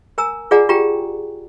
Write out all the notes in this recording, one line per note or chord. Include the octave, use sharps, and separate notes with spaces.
A#4 G#5 A#5 E6
F4 G#4 D5 F#5 G#5 A#5
F4 G4 G5 A#5